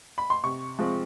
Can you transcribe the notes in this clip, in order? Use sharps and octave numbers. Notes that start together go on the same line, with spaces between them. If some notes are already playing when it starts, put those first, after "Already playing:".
B5
C6
C3 C#6
F3 G#3 C4